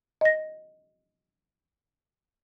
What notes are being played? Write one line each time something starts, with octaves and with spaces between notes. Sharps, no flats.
D#5 A#6